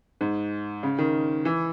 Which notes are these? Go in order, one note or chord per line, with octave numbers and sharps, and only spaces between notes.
G#2
C#3
D#3
E3